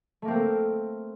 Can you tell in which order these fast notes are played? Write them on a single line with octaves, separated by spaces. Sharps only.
A3 A#3 C4 A#4